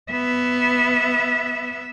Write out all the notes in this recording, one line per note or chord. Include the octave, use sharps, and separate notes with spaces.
B3 E5